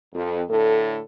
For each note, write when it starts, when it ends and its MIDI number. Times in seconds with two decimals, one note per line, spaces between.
0.14 0.43 41
0.50 0.99 45
0.50 0.99 50
0.50 0.99 69